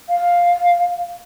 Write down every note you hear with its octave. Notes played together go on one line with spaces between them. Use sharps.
F5